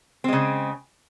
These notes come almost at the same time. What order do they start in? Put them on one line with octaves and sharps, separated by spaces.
C4 G#3 C#3